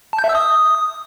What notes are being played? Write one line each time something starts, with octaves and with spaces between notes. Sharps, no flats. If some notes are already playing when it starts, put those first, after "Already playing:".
A5
G6
E5
E6
D#6